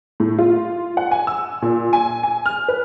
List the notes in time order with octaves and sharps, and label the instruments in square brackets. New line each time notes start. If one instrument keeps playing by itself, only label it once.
[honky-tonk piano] A2
F4
F#5
G#5
E6
A#2
G#5
G#5
F6
B4